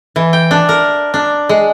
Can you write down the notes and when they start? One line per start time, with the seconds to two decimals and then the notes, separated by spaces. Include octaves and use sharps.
0.16 E3
0.33 G5
0.51 D4
0.69 A#4
1.14 D4
1.49 G#3